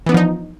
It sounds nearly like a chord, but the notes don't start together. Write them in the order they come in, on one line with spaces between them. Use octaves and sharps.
E3 B3 D4 F3 D#4